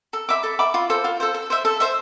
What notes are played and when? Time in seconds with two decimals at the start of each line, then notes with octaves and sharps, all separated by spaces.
0.13 A4
0.29 E5 B5 D6
0.43 A4
0.59 E5 B5 D6
0.74 F4
0.90 A4 C5
1.04 F4
1.20 A4 C5
1.34 A4
1.50 C5 E5
1.65 A4
1.80 C5 E5